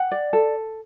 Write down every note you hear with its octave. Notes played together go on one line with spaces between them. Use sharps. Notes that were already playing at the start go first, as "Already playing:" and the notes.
Already playing: F#5
D5
A4